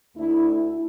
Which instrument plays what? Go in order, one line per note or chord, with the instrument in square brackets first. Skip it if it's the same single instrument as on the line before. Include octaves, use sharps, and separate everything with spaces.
[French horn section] D2 D3 A3 E4